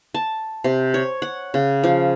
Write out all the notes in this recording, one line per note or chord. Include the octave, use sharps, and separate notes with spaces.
A5
C3
C#5
F#5
C#3
F3